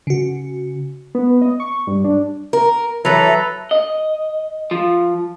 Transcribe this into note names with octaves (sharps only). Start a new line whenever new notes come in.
C#3 F#4
B3
D#5
C#6
G2
D4
A#4
E3 F#3 A4 B4 A#5
D#5
F3